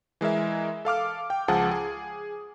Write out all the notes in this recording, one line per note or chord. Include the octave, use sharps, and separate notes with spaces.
E3 G#3 A#4 E5
A4 F5 D6 F6
G5
C#2 F3 G#4 F#5 A5
G#4